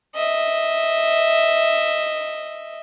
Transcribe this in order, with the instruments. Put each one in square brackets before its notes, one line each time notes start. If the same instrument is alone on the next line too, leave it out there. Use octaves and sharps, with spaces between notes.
[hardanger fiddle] D#5 E5